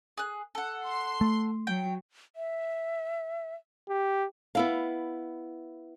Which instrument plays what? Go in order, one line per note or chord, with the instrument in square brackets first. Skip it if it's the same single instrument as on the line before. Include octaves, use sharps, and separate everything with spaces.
[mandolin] G#4 F#6
A4 F#5
[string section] C6
[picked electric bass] A3
[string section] F#3 [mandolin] G5
[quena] E5
[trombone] G4
[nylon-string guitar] B3 E4 F5